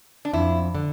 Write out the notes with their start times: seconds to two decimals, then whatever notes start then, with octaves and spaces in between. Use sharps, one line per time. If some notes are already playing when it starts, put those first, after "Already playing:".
0.25 D4
0.33 F2 E4
0.75 D3